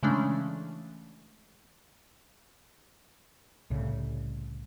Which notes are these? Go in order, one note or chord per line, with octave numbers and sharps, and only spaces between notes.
C#3 E3 G#3 A3 C#4 D4
C2 A2 C#3